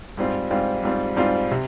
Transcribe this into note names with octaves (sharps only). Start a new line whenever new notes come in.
G#2 G3 C4 F4
G#2 G3 C4 F4
G#2 G3 C4 F4
G#2 G3 C4 F4
C3